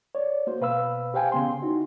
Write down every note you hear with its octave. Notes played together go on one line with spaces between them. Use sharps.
C#5 D5
A#3 F#4 C5
B2 B4 F5 B5 E6
G4 C5 F5 G5 G#5
C#3 B3 C6
D#4 E4 F#4